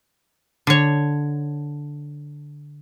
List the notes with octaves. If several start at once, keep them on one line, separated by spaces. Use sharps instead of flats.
D3 C#5